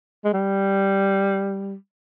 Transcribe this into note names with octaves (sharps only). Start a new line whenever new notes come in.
G#3
G3